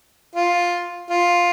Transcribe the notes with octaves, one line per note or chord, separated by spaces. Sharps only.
F4
F4